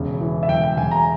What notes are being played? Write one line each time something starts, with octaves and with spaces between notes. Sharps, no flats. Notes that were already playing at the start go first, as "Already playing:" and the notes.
Already playing: E1 C#3
E3
E5
E1 G5
G5
E1 G#5
A#5